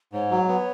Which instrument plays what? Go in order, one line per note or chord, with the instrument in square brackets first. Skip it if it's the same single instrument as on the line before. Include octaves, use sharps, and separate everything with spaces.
[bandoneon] G#2 [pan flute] C#5
[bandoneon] F#3
B3